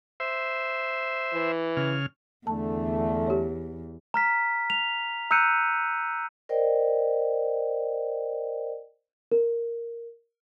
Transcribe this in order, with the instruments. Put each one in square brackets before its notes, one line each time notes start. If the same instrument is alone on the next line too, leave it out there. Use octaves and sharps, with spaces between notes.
[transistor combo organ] C5 E5
[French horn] E3
[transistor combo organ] C#3 F6
[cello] E2 [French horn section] D3 A3 [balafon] A5
[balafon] G4 C#5
[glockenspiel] A#5 F6 B6
F7
A#5 E6 F#6 G6 C#7 D#7
[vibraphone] A#4 C5 D5 D#5 G5
[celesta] A#4